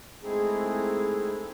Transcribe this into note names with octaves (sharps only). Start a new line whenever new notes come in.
G#3 A3 C4 D#4 E4 G#4